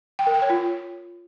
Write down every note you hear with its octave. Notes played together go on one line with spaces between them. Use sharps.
G5
A#4
G5
C#5
F4